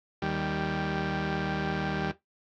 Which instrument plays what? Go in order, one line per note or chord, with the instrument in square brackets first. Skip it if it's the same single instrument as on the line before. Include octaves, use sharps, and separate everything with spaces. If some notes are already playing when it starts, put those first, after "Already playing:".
[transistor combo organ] D#2 G3